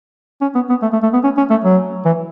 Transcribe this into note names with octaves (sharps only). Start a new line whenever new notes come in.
C#4
B3
B3
A3
A3
A3
B3
C#4
C#4
A3
F#3
E3